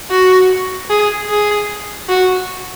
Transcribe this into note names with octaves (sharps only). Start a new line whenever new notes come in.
F#4
G#4
G#4
F#4